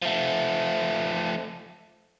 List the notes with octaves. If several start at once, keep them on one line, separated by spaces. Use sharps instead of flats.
F3 A3